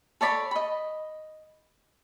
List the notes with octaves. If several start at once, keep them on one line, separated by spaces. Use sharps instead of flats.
A4 C#5 D5 B5
D#5 B5